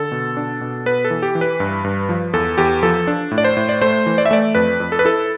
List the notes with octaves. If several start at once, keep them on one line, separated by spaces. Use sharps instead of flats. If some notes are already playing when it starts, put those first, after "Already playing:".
Already playing: D3 A4
B2
D4
B2
B3 B4
A4
E3
G4
E3
B4
G2
G2
F3
E2 A4
E2 G4
F3 A4
D4
A2
D5
C5
A2
D5
A3 C5
E3
D5
E5
A3 D5
F2 B4
F2
A4
B4
E4 A4